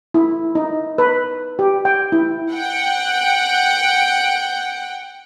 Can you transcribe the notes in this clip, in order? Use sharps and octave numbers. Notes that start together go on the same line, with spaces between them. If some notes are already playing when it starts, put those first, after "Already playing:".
E4
D#4
B4
G4
G5
E4
F#5 G5